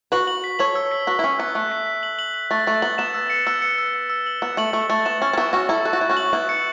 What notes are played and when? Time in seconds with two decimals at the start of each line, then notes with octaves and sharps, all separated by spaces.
0.12 F#4 B4 F#7
0.27 F#7
0.44 B6
0.59 A4 C#5 F#7
0.75 E6
0.91 B6
1.07 F#4 B4 B6
1.19 E4
1.24 C#4 B6
1.39 B3 F#6
1.55 A3 F#6
1.72 B6
1.87 B6
2.03 F#7
2.19 F#7
2.34 F#7
2.51 A3 A6
2.67 A3 A6
2.82 B3 F#7
2.98 B3 E7
3.14 E6
3.30 C#7
3.47 B3 E6
3.62 C#7
3.78 E6
3.94 E6
4.10 E6
4.27 F#7
4.42 B3 E6
4.57 A3 F#7
4.73 A3 E6
4.90 A3 A6
5.05 B3 E7
5.22 C#4 A6
5.33 C#4
5.37 B3 E4 C#6
5.53 C#4 F#4 C#6
5.69 E4 A4 C#6
5.85 A4 F#6
5.93 F#4
6.01 E4 F#6
6.09 C#4 F#4
6.17 F#7
6.33 B3 E4 F#6
6.49 C#7